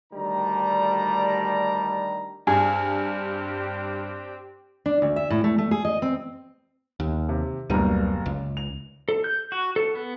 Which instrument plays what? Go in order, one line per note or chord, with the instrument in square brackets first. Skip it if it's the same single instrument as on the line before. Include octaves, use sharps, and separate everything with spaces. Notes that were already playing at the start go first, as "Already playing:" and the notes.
[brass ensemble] D2 D#3 G3 D4 A#5
[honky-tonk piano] G2 [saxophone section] C4 D4 G4 [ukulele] G#4
[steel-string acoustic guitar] D4
D2
E5
A2
A3
A3
G#4
D#5
C4
[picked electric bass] D#2
[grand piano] C3
[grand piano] F#1 A#5 D#7 [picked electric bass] D2 B2 G3
[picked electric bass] C#2
[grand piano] F7
[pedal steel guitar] A4
G6
F#4
A4
B3